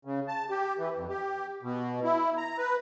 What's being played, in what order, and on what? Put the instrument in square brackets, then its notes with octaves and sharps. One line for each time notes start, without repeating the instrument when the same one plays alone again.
[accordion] C#3
A5
G4
E3
F2
G4
B2
E4
A#5
B4